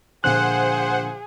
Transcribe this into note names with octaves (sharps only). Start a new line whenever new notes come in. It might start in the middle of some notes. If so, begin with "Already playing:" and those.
A#2 D3 F3 G#4 C5 F#5 F#6